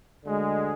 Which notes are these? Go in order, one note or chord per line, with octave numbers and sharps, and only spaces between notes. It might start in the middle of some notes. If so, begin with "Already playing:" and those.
D2 D3 G#3